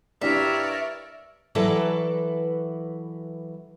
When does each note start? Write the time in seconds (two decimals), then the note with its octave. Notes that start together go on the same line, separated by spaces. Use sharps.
0.22 G2 D4 E4 G4 A#4 C#5 D5 E5
1.55 E3 F#3 E4 A4 B4 D5